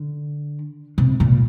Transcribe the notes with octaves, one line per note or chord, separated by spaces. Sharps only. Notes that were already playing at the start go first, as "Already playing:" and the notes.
Already playing: D3
C3
A#2